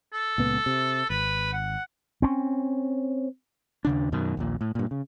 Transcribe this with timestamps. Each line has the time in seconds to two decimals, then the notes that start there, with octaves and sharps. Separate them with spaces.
0.13 A4
0.38 C#2 A#2 B3
0.66 C3
1.10 G#1 B4
1.53 F#5
2.22 C4 C#4
3.85 D#2 C#3 D4
4.12 F#2 B2 D#3
4.37 A#1 D#2 A#2
4.61 A2
4.75 G2 A#2
4.91 C#3